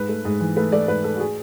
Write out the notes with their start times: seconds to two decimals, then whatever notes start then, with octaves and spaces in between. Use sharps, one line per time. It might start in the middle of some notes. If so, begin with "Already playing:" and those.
Already playing: G#2 B4
0.09 A3
0.25 G#2
0.41 E3
0.56 A3 B4
0.72 A3 D5
0.88 G#2 B4
1.04 A3 A4
1.16 F#4
1.19 G#4